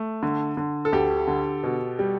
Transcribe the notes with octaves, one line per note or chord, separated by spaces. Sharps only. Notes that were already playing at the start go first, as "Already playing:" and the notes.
Already playing: A3
D3
D3
A4
D2 G4
D3
B2
G3